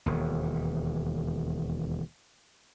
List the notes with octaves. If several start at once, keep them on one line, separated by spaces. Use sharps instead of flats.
E1 D#2